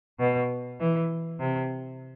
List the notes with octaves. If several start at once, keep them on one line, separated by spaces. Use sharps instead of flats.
B2
E3
C3